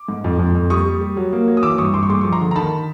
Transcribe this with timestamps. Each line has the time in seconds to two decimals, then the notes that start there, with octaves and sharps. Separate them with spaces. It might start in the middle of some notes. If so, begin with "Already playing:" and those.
Already playing: D6
0.08 G#2
0.24 F2
0.39 F2
0.55 F2
0.70 G3 C#6 D#6
0.86 G3
1.01 G3
1.17 F#3
1.33 A#3
1.47 F#3
1.57 D#6
1.63 E3 D6 E6
1.78 G2 C#6 D#6
1.94 G2 C6 D6
2.03 C#6
2.09 G#3 C6 D6
2.21 F3 C#6
2.32 A#5 C6
2.40 D3
2.51 A#5
2.56 D#3 A5 B5